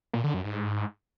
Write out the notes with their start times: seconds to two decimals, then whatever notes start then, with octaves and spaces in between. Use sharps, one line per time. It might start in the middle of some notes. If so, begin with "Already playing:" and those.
0.14 A#2
0.24 D3
0.34 F#2
0.44 G#2